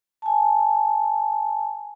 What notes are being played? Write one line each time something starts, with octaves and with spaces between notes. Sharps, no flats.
G#5 A5